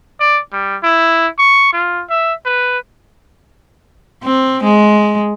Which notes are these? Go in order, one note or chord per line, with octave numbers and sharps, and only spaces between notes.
D5
G3
E4
C#6
F4
E5
B4
C4
G#3